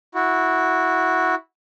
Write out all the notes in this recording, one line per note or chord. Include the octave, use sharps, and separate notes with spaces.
E4 F#4